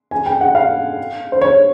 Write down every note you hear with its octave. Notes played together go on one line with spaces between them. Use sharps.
G#5
G5
F#5
F5
C5
C#5